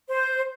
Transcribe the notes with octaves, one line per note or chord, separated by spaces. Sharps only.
C5